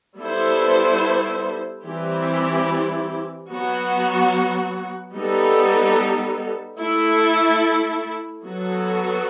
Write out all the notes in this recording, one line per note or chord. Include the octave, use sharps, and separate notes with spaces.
G3 B3 E4 A4 C5
E3 G3 C4 E4 G4
F#3 B3 F#4
G3 B3 D#4 A4
A3 E4 A4
F#3 B3 F#4 A4